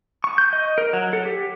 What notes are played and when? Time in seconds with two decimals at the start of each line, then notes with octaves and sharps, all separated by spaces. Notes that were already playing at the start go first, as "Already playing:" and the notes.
0.24 C#6
0.38 G6
0.53 D#5
0.78 A#4
0.93 F#3
1.13 A4
1.26 G4